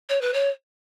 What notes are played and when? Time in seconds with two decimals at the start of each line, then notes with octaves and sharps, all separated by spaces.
0.09 C#5
0.21 B4
0.33 C#5